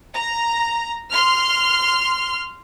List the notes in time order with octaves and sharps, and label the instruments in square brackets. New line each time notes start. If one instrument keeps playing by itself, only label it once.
[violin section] A#5
C6 F6